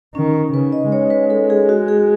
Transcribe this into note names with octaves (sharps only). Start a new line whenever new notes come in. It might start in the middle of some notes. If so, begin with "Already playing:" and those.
D#3 C#4
D#4
C#3 B4
D#5
G#3 C#5
B4
A4
G#4
F#4
G#4